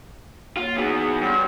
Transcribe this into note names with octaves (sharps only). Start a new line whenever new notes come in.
A#3 F4 C#5
E2 B3 D#4 F#4 G#4
G2 C#5 F#5 C6